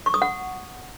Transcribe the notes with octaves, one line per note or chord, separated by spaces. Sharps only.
C#6
D#6
F#5